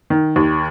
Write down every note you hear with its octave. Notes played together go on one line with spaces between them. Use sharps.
D#3
D#2